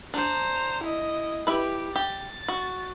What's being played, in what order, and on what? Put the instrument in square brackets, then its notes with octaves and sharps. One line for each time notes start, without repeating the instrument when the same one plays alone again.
[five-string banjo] D4 [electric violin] C5 A#5
[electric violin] E4 D#5
[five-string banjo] E4 B4 [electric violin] G4
[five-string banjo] G4 [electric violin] A6
[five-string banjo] F#4